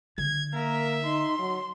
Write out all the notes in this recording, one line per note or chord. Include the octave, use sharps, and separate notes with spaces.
D3 G#6
A#3 A#4 E5
D#4 C6
F#3